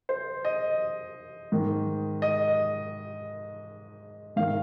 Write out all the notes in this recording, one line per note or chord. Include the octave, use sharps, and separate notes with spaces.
C5
D#5
G#2 D#3
D#5
G#2 D#3 F5